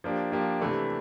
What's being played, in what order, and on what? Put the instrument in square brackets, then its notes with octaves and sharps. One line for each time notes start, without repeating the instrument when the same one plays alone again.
[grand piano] F3 A#3 D4 G4
F3 A#3 D4 G4
C3 E3 A3 D4